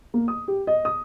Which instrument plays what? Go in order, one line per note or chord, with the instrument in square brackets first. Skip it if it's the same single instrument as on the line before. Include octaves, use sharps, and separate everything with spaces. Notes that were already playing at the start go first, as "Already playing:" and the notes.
[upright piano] A#3
D#6
G4
D#5
D#6